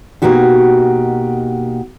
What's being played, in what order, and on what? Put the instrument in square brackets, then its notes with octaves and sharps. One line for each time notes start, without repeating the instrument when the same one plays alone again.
[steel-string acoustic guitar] B2 D#3 A#3 D#4 F#4 G4